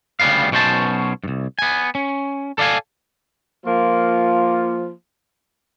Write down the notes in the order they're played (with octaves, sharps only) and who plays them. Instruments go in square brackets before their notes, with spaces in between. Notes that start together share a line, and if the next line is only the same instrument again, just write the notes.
[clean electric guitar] D2 C#3 G3 B3 F5
B1 B2 C#4 C5 A5
C2 G2
B3 G#5
C#4
A4 D5 E5 F5 G#5
[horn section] F3 A#3 F4